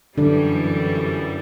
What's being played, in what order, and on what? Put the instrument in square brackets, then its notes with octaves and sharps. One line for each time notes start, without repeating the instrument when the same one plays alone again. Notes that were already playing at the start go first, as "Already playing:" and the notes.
[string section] G1 F#2 E3 G3 [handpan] D3 D4